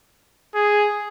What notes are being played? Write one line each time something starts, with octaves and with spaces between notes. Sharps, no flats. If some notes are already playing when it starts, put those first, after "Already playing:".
G#4